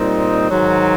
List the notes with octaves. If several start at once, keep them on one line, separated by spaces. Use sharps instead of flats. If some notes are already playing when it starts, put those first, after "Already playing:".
Already playing: A#2 G3 C4 D#4
G#2 D#3 F#3